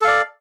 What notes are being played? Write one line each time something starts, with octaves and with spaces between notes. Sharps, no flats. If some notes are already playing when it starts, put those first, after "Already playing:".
A4 D5 F5